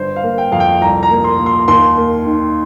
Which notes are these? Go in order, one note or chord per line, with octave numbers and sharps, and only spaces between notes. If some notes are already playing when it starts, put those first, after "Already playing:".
Already playing: G1 C5
F5
A#3
G5
F2 F5
G5
C2 A#5
A#5
A#3
C6
A#2
C6
D#2 C6
A#3
D#3